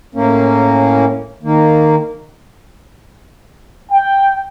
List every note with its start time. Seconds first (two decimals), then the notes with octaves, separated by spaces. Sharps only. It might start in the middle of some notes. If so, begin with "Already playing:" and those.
0.15 A2 A#3 C#4
1.43 D#3 A#3
3.92 G5